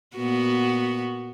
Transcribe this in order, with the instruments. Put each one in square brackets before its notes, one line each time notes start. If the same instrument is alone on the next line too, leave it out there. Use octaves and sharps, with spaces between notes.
[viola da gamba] A#2 B3 F#4